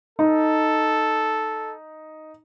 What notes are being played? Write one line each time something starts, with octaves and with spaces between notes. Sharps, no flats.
D#4 A4